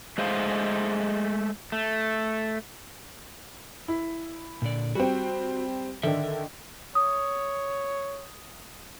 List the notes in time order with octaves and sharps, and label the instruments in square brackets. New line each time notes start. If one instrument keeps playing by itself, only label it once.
[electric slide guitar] G#3 A3 G#4 C5 F5
A3
[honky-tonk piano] E4
[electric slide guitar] A#2 D3 D5
[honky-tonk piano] G3 C4 [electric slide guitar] F#4
[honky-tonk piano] D3 D#3 D4 [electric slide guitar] A#4 E5
[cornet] C#5 [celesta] D#6